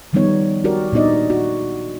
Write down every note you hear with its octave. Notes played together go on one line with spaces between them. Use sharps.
D#3 F3 G3 B3 D#4 C#5
F#4 G4 A#4 D5
A#2 B3 D4 D#4 D5 D#5
F#4